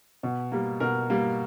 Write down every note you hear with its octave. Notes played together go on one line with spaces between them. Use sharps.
B2
G3 A#3
B2 A#4
G3 A#3